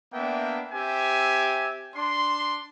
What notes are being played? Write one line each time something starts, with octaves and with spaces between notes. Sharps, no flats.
A#3 B3 D4 E5 G5
C4 G4 E5 G#5
D4 C6